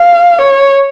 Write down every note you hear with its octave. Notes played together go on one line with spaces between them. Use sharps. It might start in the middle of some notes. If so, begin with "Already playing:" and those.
Already playing: F5
C#5